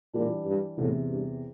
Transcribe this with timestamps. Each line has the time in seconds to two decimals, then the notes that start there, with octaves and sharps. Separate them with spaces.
0.13 A#2 E3 G3 D4
0.45 G2
0.77 E2 A2 C3 E3
1.10 G2